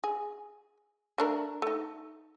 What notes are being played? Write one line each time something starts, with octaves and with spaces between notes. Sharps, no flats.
G#4
A3 D4 A#4
A3 D#4